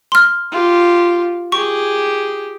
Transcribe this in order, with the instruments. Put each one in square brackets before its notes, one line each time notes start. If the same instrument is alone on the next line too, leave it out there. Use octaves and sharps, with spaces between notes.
[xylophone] C6 F6
[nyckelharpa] F4 G4
[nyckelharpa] G4 G#4 [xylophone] C#6